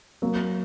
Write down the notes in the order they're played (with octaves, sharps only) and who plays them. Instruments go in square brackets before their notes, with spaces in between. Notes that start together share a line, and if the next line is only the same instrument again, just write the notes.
[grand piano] F#3 [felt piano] A#3